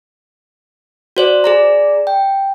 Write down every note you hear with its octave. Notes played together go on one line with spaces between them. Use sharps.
F#4 C5 D5
G#4 D5 A#5
G5